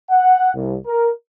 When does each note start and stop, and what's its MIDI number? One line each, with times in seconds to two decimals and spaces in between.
0.11 0.51 78
0.54 0.76 36
0.87 1.11 70